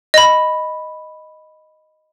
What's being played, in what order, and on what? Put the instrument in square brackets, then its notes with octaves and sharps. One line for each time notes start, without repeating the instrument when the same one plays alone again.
[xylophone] D#5 B5